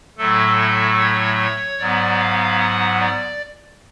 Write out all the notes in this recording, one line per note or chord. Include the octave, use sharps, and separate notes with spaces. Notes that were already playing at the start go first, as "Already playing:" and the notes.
A2 F#3 A3 A4
C#5
G#2 F#3 B3 D5
F5
F#5
D5